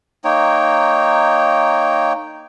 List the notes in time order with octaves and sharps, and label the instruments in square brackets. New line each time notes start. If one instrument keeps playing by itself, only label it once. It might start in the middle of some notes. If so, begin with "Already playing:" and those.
[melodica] A#3 D#4 C#5 G5